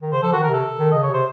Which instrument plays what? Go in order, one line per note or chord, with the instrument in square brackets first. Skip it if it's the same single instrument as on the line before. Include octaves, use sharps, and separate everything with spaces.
[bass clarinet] D#3
[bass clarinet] C#3 [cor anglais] C5
[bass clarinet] F3 [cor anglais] A4
[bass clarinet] D#3 [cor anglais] F#4
[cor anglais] A#4
[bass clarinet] C3
[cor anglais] A4
[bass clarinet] D#3
[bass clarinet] C#3 [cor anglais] D#5
[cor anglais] C#5
[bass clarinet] C3 [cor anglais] C5